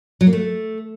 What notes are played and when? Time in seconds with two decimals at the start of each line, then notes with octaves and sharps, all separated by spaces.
0.21 F#3
0.27 A#3
0.33 A3